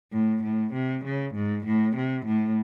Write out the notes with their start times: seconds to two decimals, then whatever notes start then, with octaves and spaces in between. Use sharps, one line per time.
0.13 A2
0.43 A2
0.73 C3
1.04 C#3
1.34 G#2
1.66 A2
1.96 C3
2.26 A2